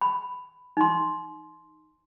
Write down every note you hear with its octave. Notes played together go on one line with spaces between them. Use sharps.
B5
D#4 C6